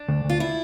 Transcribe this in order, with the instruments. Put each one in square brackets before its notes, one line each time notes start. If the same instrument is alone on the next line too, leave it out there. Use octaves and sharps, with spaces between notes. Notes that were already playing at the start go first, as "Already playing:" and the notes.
Already playing: [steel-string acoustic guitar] D4
[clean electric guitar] D2
[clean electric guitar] D2 [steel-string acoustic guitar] F4
[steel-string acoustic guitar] E4